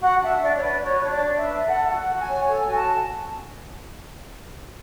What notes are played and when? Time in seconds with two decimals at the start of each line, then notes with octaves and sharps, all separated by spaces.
0.01 F#4 F#5
0.21 D4 E5
0.42 D4 D5
0.55 C#5
0.62 B4 D5
0.82 F#4 C#5
0.99 D4 C#5
1.10 D5
1.24 D4
1.37 E5
1.45 B4
1.65 A4 F#5
1.86 F#4
1.93 F#5
2.06 F#4
2.20 G#5
2.27 C#5
2.47 A4 G#5
2.68 F#4 G#5
2.75 A5